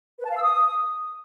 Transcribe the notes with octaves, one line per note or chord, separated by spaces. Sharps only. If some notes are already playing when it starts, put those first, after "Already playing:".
B4
A5
F5
E6
D#6